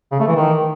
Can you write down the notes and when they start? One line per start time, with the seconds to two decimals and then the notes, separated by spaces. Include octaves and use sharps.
0.12 C#3
0.20 A3
0.28 E3
0.36 D#3